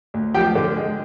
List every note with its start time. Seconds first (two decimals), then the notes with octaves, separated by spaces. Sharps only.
0.14 D2
0.34 F3 G4 G5
0.55 D3
0.76 G#3